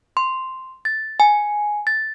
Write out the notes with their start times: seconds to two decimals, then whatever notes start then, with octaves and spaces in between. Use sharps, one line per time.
0.17 C6
0.85 A6
1.20 G#5
1.87 A6